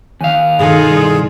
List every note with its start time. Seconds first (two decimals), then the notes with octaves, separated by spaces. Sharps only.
0.21 D#2 F5 G#5
0.59 G2 B2 D#3 D#4 F4 G#4 A4
0.91 C2